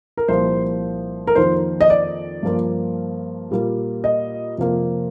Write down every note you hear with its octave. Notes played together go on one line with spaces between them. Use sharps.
A#4
C2 A#2 F3 A#3 C5
A#4
F2 D#3 A#3 C5
D#5
D5
G2 F3 A#3
A#2 G3 A#3
D#5
F2 C3 F3 A#3